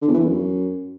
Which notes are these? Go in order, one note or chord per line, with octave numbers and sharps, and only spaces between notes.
D3
E2
E3
E2
F#2